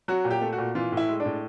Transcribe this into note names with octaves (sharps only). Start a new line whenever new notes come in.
F#3 F#4
A#2
G4
A3
F#4
A#2
E3 F4
A2
E4
G#3
D4
A2